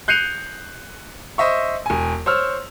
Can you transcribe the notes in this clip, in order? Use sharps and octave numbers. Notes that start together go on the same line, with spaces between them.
F#6 G6 C7 C#7 D#7 F7
C5 D#5 E5 C#6
E1 G#5
C5 C#5 E6 F6